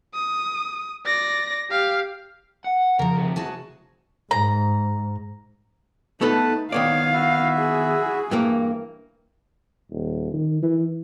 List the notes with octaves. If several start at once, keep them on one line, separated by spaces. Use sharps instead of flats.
D#6
D5 A#6
G4 F5
F#5
C#3 F3 A#4
F2 C3
F#4 G#4 A5
G#2 A#5
A3 B3 D#4 A4 B4 A5
D#3 B3 C#5 D5 F5
E4 F#4 E5
G#4
G2 E3 A#3
D#1
D#3
E3